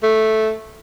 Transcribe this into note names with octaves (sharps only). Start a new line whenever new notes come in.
A3